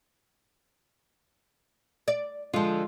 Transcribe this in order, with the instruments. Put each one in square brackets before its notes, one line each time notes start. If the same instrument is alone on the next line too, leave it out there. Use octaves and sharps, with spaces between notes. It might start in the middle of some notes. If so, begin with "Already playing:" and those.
[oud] D5
[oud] D3 F3 [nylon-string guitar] G#3 F4